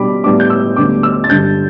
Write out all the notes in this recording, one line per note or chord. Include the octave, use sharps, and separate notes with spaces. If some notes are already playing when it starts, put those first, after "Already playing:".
Already playing: B2 G3 D4 B5 D6
A2 G3 B3 D4 D6
G6
E6
D2 D3 G3 B3 D6
E6
A6
G2 D3 G3 G6